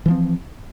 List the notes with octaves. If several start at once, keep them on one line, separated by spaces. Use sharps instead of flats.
E3 F3 C4